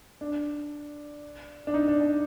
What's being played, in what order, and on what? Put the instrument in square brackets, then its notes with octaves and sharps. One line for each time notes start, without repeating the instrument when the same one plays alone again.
[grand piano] D4
D4
D#4
D4
D4